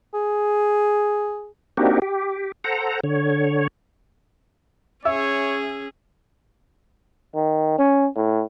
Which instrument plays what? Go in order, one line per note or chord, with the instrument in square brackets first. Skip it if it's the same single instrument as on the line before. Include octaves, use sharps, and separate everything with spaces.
[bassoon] G#4
[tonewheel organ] A#3 C4 D4 D#4 F#4 G4
G4
A4 C5 F#5 A#5
D3 C#5
[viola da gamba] C#4 G#4 [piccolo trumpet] C#5 [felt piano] E5 E6
[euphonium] D#3
C#4
A2